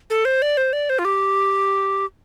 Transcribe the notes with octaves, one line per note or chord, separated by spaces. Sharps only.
A4
C5
D5
C5
D5
C5
F4
G4